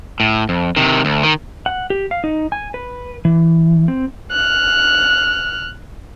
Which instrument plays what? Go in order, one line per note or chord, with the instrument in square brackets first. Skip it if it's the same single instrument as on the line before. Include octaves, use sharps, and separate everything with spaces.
[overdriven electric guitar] A2
F2
C3 D#3
D2
D#3
[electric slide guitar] F#5
G4
F5
D#4
G#5
B4
E3
C4
[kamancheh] F6 F#6